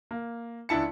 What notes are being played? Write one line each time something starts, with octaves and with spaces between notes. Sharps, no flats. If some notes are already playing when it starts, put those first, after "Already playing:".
A#3
C#2 D4 E4 A5 C#7